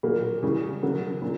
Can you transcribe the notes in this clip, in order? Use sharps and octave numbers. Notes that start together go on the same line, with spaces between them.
A#2 F#3 A#3
C#3 E3 G3
C#3 F#3 A#3
A#2